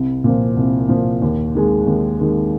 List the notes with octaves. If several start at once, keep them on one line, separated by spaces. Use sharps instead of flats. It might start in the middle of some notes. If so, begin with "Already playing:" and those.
Already playing: C2
A#2 F3
C2
A#2 F3
D#2
D#3 G#3
D#2
D#3 G#3